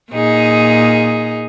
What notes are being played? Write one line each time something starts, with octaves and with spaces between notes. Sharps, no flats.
A#2 D#4 G#4